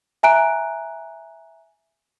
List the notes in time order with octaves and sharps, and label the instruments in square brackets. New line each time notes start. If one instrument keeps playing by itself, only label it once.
[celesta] E5 G#5 A#5 F#6 D7